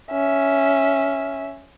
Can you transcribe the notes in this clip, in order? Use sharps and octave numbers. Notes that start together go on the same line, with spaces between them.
C#4 E5